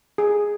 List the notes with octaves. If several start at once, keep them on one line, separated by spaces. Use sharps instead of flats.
G#4